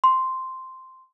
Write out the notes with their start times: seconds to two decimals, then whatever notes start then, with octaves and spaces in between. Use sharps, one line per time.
0.04 C6